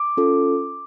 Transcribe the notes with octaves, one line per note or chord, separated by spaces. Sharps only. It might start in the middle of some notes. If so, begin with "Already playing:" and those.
Already playing: D6
C#4 F4 A4